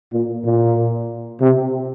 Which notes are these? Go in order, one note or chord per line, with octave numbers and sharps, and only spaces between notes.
A#2
A#2
C3